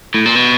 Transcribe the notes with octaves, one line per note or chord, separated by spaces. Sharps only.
A2
A#2
B2